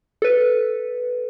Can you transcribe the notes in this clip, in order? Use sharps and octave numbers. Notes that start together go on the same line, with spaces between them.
A4 B4